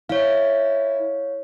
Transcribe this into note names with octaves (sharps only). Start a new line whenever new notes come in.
E4 C#5 F5